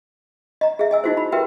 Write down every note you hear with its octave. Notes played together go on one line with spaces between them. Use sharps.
D#5 A#5
G#4 E5
D#5 G#5 E6
D#4 E4 F#4 G#4 C5
B5
F#4 G4 A#4 B4 E5 G5